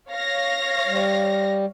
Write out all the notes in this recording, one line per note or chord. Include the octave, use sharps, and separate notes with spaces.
C#5 F5 A#6
G3